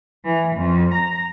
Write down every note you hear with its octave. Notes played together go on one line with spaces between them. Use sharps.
E3
F2
A#5